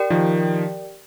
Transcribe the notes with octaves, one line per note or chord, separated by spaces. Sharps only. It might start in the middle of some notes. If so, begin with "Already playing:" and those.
Already playing: G4 A#4 D5 G5
D#3 F3